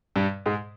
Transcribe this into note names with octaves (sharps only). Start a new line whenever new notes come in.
G2 G3
G#2 G#3